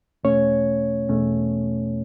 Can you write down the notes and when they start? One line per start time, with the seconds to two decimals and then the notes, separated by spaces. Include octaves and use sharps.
0.24 E2 B2 A3 C#4 C#5
1.09 E2 B2 A3 C#4